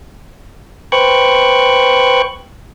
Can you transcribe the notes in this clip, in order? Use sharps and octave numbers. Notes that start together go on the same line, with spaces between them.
B4 C5 G5 C#6 F#6